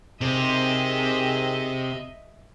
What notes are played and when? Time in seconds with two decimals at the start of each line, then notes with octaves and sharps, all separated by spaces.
0.21 C3 D#3 C4 G#4 D#5 E5